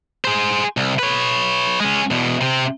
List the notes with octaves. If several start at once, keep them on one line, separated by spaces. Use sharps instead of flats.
G#4 C5
C2
B4 C#5
G#3 C#4
E2 B2
C3 C4